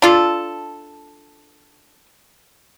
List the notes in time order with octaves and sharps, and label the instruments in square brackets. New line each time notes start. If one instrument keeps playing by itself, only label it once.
[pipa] D4 F4 A4